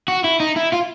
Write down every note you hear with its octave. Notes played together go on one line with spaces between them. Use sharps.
F#4
E4
D#4
E4
F4